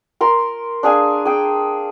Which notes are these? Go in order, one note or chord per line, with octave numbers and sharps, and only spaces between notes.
A#4 A#5 C6
D4 G#4 F5 G#5
G#4 G5